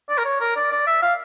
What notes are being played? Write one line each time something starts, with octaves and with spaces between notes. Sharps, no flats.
D5
A#4
C#5
A#4
D5
D5
E5
F5